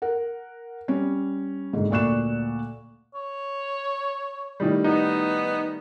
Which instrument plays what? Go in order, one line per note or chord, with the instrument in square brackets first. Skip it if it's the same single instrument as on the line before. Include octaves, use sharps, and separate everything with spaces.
[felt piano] A#4 F#5
G3 C#4
F#1 G#2 D3
D2 A#2 D5 C#6 F#6 E7
[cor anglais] C#5
[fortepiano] A2 D#3 G3
[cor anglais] B3 [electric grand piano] D#4